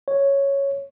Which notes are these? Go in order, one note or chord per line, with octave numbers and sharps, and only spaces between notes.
C#5